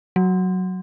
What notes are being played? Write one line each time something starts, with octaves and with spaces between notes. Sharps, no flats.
F#3